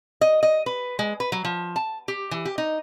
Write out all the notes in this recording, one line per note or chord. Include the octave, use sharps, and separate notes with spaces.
D#5
D#5
B4
G#3
B4
F#3
F3
A5
G4
E3
G4
D#4